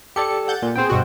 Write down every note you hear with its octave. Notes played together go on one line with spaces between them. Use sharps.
G4 A4 D5 C#7
F#5 G6 A6
A#2
B3 C4 G#4 C5 G5
G2 B2 F#4